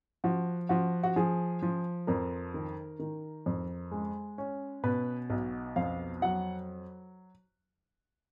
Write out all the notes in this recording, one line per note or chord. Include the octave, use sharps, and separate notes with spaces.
F3 F#4
F3 F#4
F#4
F3 G#4
F3
F2 A#4
D#3
D#3
F2
G#3
C#4
B2 B4
B1
F2 F5
F#3 F#5